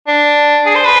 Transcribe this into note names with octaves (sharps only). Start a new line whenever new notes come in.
D4
G#4
C5
B4